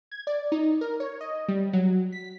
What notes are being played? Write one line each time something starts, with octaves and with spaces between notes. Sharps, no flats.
G#6
D5
D#4
A#4
C#5
D#5
G3
F#3
B6